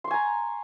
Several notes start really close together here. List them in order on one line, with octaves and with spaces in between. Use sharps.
C6 C#6 G#5 A#5